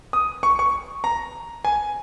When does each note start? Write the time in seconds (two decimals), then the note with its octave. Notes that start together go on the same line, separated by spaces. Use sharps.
0.13 D#6
0.43 C#6
0.59 C#6
1.04 A#5
1.65 G#5